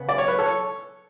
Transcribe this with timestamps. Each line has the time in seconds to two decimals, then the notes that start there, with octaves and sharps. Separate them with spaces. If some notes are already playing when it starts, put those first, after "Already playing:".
Already playing: C#3 B3
0.09 D5
0.18 C#5
0.28 B4
0.39 A4 C#5